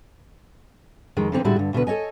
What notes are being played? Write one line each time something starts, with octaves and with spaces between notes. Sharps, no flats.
F2 D#3 G#3
D3 E3 C4 D#4
A2 D3 G3 G#3 E4 F#4
G2 D3
D2 B2 D3 B4
A4 C#5 D#5 G#5